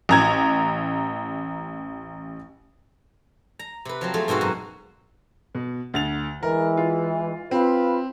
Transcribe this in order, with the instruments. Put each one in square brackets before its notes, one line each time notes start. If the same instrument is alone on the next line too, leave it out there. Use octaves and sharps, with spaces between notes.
[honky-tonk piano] A1 A#5 G#6
[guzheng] A#5
C3 B4
F3 F#3 C4
A3 F4 G#4
G#2 B2 C4 F#4 F5
F#2
[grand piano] B2
D2 A6 F7
[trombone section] E3 G#3 [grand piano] A#4
[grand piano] F4
[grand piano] C4 [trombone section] F4 B4